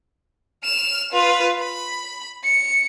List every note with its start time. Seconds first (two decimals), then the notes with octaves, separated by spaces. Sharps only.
0.64 F6 E7
1.12 F4 B4
1.59 B5
2.43 C#7